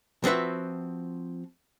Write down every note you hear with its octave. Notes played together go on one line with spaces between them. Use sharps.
F3 C4 F#4 B4 E5